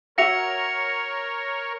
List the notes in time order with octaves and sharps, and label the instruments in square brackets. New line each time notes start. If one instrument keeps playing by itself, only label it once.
[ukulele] F#4 E5 F#5 [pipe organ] A#4 C#5 [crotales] A#6 C#7 F7